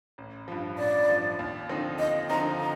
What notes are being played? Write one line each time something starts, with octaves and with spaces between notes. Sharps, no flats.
A1
G2 F3
A1 D5
G2 F3
D#2
D3 F3 C4 D#4
D#2 D#5
D3 F3 C4 D#4 A#5
A#5